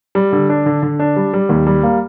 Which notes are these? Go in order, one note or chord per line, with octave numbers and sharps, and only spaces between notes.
G3
D3
D4
D3
D3
D4
G3
G3
D#2
G3
A#3